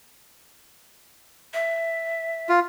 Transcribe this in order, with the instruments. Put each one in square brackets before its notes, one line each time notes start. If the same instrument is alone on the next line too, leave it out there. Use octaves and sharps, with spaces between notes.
[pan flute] E5
[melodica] F4